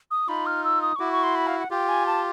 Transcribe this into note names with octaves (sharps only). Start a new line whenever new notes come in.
D#6
D#4 F4 B5
F6
E6
D#6
C#6
E4 F#4 D6
C#6
C6
B5
F5
F#5
F4 G4 G5
G#5
A5